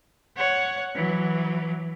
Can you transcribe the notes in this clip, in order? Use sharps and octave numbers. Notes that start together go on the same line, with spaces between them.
C#5 F#5
E3 F#3